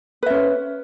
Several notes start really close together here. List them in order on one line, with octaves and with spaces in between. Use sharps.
B4 E5 C#4 C5